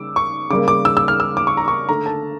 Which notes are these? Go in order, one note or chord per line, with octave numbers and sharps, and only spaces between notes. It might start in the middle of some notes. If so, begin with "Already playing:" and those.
Already playing: C#3 G3 D6 E6
C#6
C#3 G3 A#3 D6
D6
E6
E6
F6
E6
D6
C#6
A#5
C#6
D3 A3 A#5
A5